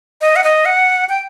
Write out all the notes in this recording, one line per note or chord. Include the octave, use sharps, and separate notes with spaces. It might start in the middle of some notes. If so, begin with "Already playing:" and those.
D#5
F#5
D#5
F#5
G5